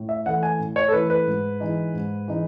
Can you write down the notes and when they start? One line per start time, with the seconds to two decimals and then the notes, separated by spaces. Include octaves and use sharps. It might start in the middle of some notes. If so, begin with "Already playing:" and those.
Already playing: A2
0.09 E5
0.26 E3 A3 E4 F#5
0.43 G#5
0.59 A2
0.76 C#5
0.88 A4
0.93 E3 A3 E4 B4
1.10 B4
1.27 G#2
1.60 E3 G#3 D#4
1.94 G#2
2.28 E3 G#3 D#4